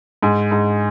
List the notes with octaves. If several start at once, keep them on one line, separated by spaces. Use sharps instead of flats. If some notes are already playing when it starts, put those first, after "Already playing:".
G#2
G#2